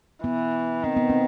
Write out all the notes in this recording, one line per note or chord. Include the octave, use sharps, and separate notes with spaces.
E3 B3
D#3 C4
B3
C4